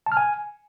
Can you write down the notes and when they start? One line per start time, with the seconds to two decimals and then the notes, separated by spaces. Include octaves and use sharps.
0.06 A5
0.12 F6
0.17 G#5